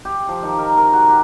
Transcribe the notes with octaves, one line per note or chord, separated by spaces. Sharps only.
G4
F3
D#3
A#4
A#4
F#4
G4